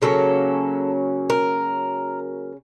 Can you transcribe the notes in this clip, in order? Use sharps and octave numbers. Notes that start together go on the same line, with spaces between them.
C#3 F#3 A#3 C#4 A4
A#4